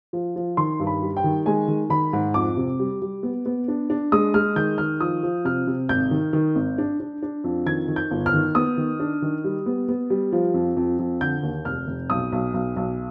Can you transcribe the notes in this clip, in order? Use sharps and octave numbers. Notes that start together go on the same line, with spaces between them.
F3
F3
D#3 C6
G2
B5
G3
G5
D#3
G#3 G#5
D#3
D#3 B5
G#2
F2 D6
C3
G3
G3
B3
B3
D4
D4
G#3 D#6
G#3 F6
D#3 G6
D#3 F6
F3 D#6
F3
C3 F6
C3
G#1 G6
D#3
D#3
G#1
D4
D4
D4
F2
D#3 G#6
D#3
G6
G1
F6
D#3
B3 D#6
D#3
D4
D#3
G3
B3
B3
G3
F3
F2
F2
F2
D3 G6
D#2
F1 F6
F1
B1 D#6
B1
B1
B1